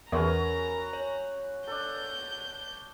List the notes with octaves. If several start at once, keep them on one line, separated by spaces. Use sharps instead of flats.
E2 C#4 F#4 A#4 A#5 B5
C#5
D4 A4 G6